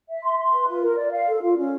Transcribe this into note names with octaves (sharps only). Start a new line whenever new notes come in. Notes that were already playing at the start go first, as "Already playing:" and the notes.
E5
C6
C6
B4
F4
A#4
D5
F5
A4
F4
C#4